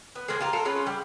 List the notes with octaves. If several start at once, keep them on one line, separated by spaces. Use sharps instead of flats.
B3
G#3 A#3 C4 G#4
F4 G4 A#4
F4 A4 A#4
G#3 C#4 F4 B4
G3